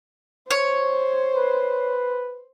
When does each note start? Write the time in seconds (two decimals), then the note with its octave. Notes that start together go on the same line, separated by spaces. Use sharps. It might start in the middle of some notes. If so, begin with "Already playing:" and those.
0.51 C5 C#5
1.30 B4